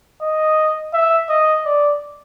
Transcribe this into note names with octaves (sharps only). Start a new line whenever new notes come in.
D#5
E5
D#5
D5